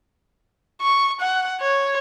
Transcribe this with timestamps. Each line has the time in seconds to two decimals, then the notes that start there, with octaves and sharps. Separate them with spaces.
0.81 C#6
1.20 F#5
1.61 C#5